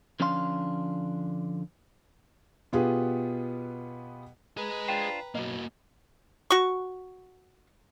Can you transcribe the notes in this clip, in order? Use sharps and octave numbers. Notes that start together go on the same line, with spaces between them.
D3 F3 C#4 D4 F5 C6
B2 B3 F4 G4 G#4
G#4 B4 D#5 A#5
D4 F4 C5 G5
B1 A#3 F#4 D#5
F#4 C#6